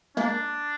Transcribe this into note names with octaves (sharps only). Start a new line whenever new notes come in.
G#3 A#3 D4